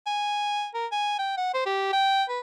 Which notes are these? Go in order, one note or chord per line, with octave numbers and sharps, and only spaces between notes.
G#5
A#4
G#5
G5
F#5
C5
G4
G5
B4